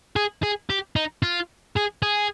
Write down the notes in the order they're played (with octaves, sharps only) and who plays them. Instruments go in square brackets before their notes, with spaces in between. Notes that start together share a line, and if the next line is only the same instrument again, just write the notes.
[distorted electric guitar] G#4
G#4
G4
D#4
F4
G#4
G#4